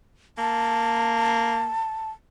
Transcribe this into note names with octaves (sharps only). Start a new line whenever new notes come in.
A#3 A5